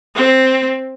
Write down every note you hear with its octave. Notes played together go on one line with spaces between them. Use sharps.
C4